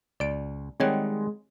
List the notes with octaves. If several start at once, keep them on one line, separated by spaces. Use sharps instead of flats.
C#2 D5 D7
D#3 G3 G#3 C4 C#5 F#5 G5